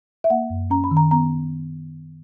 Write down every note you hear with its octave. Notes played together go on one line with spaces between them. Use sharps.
E5
A#3 F#5
F#2
C#4 A#5
B5
D#3
A#5
B3 A#5